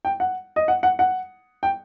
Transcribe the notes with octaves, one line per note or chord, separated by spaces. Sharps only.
G5
F#5
D#5
F#5
F#5
F#5
G5